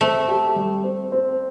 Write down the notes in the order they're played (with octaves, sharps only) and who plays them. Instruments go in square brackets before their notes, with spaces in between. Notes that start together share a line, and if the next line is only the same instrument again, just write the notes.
[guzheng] A3 [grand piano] C4
[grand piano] G4
G3
C4
C4